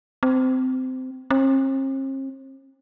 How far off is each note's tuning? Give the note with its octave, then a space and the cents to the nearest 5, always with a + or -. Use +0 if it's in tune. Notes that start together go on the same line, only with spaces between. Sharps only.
C4 -20
C4 +45